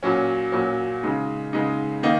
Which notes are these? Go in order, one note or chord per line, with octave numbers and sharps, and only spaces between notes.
A#2 F#3 C#4
A#2 F#3 C#4
C#3 G#3 D#4
C#3 G#3 D#4
D#3 A#3 D#4